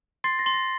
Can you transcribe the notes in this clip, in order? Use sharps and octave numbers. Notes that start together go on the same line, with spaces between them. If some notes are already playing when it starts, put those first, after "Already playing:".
C6 A6 C7
A#6
C6
A#6